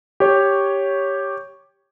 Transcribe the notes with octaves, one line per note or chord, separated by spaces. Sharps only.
G4 C#5